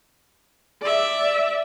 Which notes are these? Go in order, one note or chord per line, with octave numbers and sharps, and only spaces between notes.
D5 E5